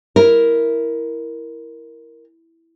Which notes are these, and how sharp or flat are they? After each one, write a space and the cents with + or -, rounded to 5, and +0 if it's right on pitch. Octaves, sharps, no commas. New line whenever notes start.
E4 +0 A#4 +0